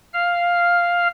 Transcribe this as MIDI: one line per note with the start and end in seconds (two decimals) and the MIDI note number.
0.13 1.08 77
0.13 1.08 89